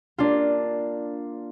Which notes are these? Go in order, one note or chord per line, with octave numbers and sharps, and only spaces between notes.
A#3 D4 F4